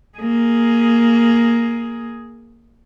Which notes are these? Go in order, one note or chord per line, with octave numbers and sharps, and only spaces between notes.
A#3 G#4